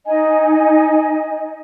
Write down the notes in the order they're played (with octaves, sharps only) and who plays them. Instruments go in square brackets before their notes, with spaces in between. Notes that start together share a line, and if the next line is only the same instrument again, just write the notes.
[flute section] D#4 D#5 G#5